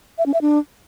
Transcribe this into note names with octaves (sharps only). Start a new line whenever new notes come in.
E5
C#4
E5
D4